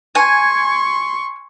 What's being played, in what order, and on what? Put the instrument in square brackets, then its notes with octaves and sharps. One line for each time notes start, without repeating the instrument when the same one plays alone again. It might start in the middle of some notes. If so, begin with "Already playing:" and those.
[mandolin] G#5 [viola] C6 C#6